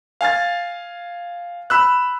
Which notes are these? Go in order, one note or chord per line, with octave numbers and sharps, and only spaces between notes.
F5 G#5 F6 A6
B5 E6 F#6